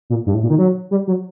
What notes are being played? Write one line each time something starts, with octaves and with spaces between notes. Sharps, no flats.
A#2
G2
A2
A#2
D#3
F#3
G3
F#3